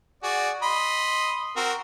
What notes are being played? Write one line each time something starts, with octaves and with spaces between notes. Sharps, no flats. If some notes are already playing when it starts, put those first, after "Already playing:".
F#4 G#4 D5
D#5 B5 C6
C4 F#4 A#4